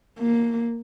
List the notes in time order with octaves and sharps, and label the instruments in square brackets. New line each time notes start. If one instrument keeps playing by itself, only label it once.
[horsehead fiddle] A#3